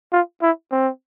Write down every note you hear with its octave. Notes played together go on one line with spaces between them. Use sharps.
F4
E4
C4